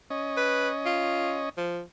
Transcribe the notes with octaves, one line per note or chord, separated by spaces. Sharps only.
C#4 D#5
B4
F4
F3